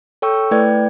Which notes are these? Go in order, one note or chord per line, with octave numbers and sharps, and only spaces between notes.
A4 C#5 G5 C#6 E6
A3 E4 B4 D5 G5 G#6